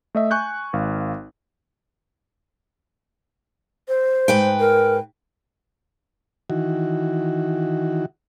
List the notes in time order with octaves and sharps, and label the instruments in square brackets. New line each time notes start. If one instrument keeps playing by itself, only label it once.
[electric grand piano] A3 D#5 E5
G#5 C#6 F#6 G6
G#1 F5
[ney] C5
[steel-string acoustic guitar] G#2 B4 G5
[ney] A#4
[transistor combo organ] D#3 E3 F#4